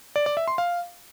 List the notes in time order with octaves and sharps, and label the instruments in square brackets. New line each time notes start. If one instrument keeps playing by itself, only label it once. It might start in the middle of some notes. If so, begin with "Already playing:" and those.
[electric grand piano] D5
D5
E5
C6
F5